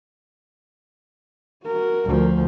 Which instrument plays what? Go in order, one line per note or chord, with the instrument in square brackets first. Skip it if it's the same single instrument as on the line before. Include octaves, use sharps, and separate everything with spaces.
[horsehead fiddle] F#4 A#4
[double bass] D2 F3